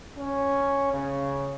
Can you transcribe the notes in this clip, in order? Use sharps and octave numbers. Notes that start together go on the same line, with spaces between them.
C#4
C#3